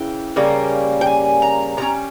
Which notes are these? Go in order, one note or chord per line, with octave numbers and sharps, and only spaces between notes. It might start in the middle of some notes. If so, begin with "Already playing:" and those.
Already playing: C#3 E3 G5
C#3 G3 A#3 C#4
G5
G#5
A#5
C3 G3 C#4 A#5